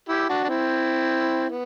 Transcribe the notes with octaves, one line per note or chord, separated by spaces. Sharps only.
E4 G4
D4 F#4
D4
C4 E4
B3